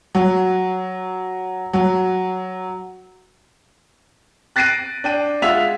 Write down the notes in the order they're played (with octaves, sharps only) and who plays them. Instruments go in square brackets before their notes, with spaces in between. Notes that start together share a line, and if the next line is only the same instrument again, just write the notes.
[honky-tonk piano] F#3
F#3
[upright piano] F#6 A6 A#6 C7 D7 D#7
D4 G5 D#7
G#3 F4 E5 F#5 B6 F7